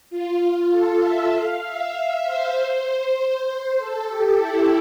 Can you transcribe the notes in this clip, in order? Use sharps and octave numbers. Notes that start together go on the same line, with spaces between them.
F4
A4
E5
F5
E5
E5
C5
A4
G4
E4